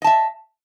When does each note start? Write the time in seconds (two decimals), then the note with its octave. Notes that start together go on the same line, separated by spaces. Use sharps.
0.02 D#5
0.04 A5
0.07 E5